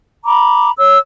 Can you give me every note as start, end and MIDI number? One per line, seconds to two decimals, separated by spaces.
0.25 0.71 82
0.25 0.71 83
0.25 0.71 86
0.78 0.98 73
0.78 0.98 88